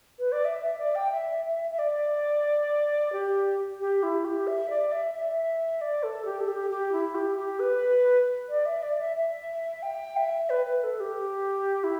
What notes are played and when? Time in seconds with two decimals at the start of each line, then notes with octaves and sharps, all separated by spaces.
0.19 B4
0.32 D5
0.45 E5
0.62 E5
0.78 D5
0.95 G5
1.12 E5
1.46 E5
1.71 E5
1.79 D5
3.13 G4
3.80 G4
4.03 E4
4.25 G4
4.47 E5
4.70 D5
4.92 E5
5.14 E5
5.81 D5
6.03 A4
6.25 G4
6.40 A4
6.48 G4
6.71 G4
6.92 E4
7.15 G4
7.37 G4
7.60 B4
8.49 D5
8.66 E5
8.83 D5
8.99 E5
9.16 E5
9.83 G5
10.17 E5
10.50 B4
10.66 B4
10.84 A4
11.00 G4
11.84 E4